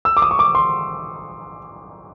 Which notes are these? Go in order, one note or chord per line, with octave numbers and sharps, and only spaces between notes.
E6
D6
D#6
C#6
D6
C6